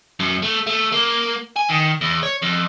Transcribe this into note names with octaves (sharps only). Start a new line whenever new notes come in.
F#2
A3
A3
A#3
G#5
D#3
E2
C#5
F2